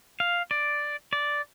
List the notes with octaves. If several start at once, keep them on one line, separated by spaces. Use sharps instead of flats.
F5
D5
D5